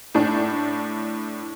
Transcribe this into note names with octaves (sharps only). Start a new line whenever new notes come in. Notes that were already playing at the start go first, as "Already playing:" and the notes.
A2 D4